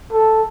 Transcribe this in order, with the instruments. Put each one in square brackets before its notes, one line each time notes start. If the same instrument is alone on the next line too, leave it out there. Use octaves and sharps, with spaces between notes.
[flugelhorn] A4